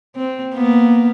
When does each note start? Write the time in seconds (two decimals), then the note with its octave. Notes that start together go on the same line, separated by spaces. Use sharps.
0.16 C4
0.55 A#3 B3